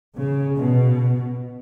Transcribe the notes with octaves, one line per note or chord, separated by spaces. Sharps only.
C#3
B2